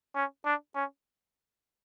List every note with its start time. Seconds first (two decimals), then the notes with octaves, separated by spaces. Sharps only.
0.15 C#4
0.45 D4
0.75 C#4